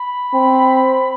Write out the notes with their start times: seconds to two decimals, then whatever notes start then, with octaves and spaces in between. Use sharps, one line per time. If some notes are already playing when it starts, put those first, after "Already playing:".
Already playing: B5
0.34 C4